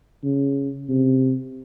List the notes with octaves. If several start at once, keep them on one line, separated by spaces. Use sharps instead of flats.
C#3
C3